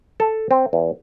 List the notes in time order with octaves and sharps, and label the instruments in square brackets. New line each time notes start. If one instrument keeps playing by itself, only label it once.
[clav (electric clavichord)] A4
C4
E2